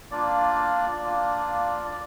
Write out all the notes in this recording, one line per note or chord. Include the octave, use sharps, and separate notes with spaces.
A#3 D4 F4 D5
A#3 D4 F4
D5